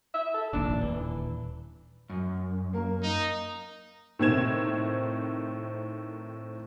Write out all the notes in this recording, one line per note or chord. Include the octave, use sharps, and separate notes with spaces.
E5
A4
F1 A#1 D#2 D4
D#1 E3
F#2
A#3 A#4
D#4
A2 C3 D#3 C4 G#6 E7